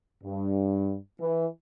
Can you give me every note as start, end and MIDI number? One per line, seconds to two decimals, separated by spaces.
0.23 0.96 43
1.20 1.47 52